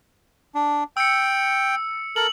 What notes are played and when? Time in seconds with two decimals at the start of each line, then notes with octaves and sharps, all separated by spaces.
0.55 D4
0.97 G5 E6 C#7
2.16 A4 A#4 F#7